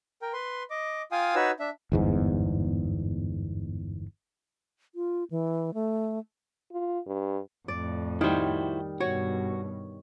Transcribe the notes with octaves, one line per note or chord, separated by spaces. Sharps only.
A#4 G5
B4 C6
D#5 D6
F4 F5 G5 G#5 D#6
D#4 F#4 B4 C#5 E6
D4 E5
G1 E2 G#2
F4
E3
A3
F4
G2
F2 A2 D5
D#3 G3 E4 F#4 C5
G2 B2 F#4 C#5